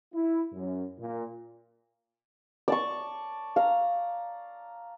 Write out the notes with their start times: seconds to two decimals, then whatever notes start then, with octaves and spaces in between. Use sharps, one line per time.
0.13 E4
0.53 F#2
1.00 A#2
2.68 D5 A5 C#6
3.56 F5 A#5